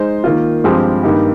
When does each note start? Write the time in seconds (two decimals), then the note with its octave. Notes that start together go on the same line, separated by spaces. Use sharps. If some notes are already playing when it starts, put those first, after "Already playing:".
Already playing: G#3 D#4 C5
0.24 D#3 A#3 F4
0.64 G2 F3 G#3 C4 G4
1.03 G2 D#3 A#3 D#4 G4